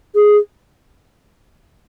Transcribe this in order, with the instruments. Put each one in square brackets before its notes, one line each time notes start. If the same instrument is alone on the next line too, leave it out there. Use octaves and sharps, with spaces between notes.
[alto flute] G#4